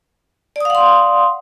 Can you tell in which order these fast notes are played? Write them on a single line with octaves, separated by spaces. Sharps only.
D5 D#6 F5 F#5 C6